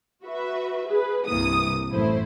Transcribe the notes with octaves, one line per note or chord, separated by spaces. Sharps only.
F#4 B4 E5
G#4 B4
C2 G2 C3 E3 A#3 D#6
A1 F#2 F3 A3 E4 C5